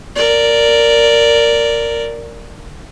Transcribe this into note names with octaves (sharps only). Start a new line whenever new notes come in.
A#4 D5